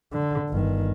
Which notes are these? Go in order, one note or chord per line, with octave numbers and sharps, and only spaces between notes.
D3
G1 D#3